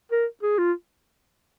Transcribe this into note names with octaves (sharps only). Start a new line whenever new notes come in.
A#4
G#4
F4